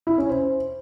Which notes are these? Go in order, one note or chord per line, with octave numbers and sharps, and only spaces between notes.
E4
C#4
C5